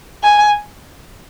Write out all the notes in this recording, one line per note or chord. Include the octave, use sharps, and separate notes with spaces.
G#5